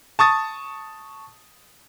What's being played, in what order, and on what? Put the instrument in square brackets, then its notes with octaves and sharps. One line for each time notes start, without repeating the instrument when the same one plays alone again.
[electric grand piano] A5 C#6 D#6 A6